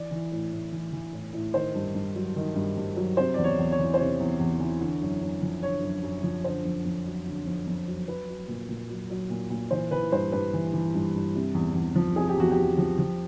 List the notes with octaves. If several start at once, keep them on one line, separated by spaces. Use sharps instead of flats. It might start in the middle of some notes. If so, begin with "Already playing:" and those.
Already playing: E3 D5
E3
A2
A2
E3
E3
A2
A2
D#3 C5
G2
G2
F#3
D#3
G2
G2
F#3
C3 C5
E2 D5
C#5
E2
C#5
E3
C5
C3 C#5
E2
E2
E3
D3
F#2
F#2
F3
D3 C#5
F#2
F#2
F3
D3 C5
F2
F2
F#3
D3
F2
F2
F#3
F#3 B4
F#3
A#2
A#2
F#3
F#3
A#2
A#2
E3 C5
E3 B4
G2 C5
G2 B4
E3
E3
G2
G2
C3
E2
E2
F3
C3 G#4
G4
E2 F#4
G4
E2
F3
F3